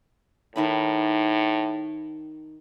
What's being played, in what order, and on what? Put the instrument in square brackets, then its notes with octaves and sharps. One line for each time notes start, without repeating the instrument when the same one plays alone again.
[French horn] A2 [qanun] D#3 D#4 B5